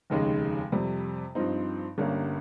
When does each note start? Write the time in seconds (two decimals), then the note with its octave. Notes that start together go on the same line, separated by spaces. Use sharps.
0.10 F1 D#2 C#3 G#3 D#4
0.72 F2 C3 G3
1.35 G2 F3 C4 D#4
1.98 G1 G2 G3 A#3 C#4